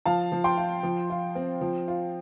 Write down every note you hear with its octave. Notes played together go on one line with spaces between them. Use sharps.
F3 F5 A5
F3
G5 C6
F4
F3
F4
C4
F3
F4